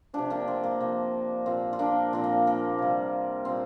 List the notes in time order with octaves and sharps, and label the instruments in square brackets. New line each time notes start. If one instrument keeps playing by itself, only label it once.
[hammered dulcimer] C3 F3 D4 G4
A#3 D4
C4
A#3
C3 F3 A#3
A#2 F3 C4
F4
A#3 D4
A#2 F3 C4
A#3
A#3
C3 G3
A#2 G3 C4